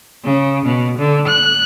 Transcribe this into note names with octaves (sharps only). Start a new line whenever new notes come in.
C#3
B2
D3
F#6